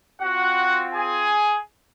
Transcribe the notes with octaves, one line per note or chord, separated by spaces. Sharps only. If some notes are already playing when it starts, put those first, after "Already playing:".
C4 F4 F#4 F#5
G#4 G#5